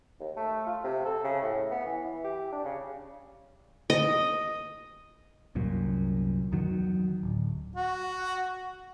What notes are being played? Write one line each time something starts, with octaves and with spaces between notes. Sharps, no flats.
D#2
A3
F4
C3
A4
C#3
A2
B3
E3
G4
D4
C#3
D#5
C2 F#2 A#2
E2 D#3 F#3
D1
F#4